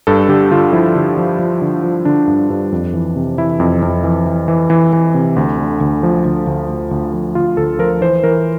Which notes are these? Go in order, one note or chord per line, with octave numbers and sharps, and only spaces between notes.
G2 A4
D3 G4
D3 F4
F3 E4
D3
F3
F3
D3
F3
D3 D4
G2
G2
F2
E3
C3
E3 E4
F2
F2
E3
E3
E3
E3
E3
C3
D2
D3
D2
F3
D2
D2
D2
D2
F3
D2 F4
D2 A4
F3 A#4
E3 C5
E3 A#4